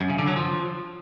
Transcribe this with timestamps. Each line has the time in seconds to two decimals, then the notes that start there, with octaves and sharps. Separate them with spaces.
0.01 F#2
0.10 C#3
0.19 D3
0.27 F#3
0.36 F3